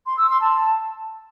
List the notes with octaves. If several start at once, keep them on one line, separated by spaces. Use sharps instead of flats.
C6
E6
C6
A5